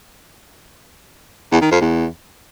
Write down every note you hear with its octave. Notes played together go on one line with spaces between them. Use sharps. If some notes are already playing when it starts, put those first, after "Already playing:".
E2
D#3
F2
E2